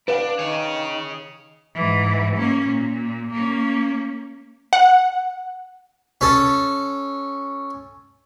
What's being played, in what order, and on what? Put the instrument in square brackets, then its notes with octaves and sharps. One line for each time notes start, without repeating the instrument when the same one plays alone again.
[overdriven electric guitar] D4 [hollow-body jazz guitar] B4 F5 G5
[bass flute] D#3 [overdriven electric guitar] G#4 C#5
[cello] G#2 E3
A#3 C#4
A#2
A#3 C#4
[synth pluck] F#5
[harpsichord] C#4 A4